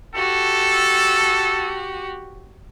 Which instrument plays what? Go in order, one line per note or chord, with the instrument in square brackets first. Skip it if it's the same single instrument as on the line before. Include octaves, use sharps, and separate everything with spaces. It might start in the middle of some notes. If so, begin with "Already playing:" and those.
[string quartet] F#4 G4 [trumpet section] A4